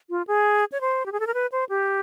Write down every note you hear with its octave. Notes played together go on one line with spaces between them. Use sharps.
F4
G#4
C#5
C5
G4
G#4
A4
A#4
B4
C5
G4